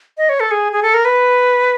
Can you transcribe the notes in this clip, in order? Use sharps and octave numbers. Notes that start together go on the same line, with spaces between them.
D#5
C#5
A4
G#4
G#4
A4
A#4
B4